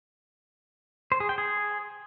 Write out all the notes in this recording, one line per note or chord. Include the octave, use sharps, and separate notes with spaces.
C5
G#4
G5
G#4